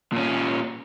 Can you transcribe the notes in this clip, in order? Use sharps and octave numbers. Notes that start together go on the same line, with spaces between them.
A#2 C#4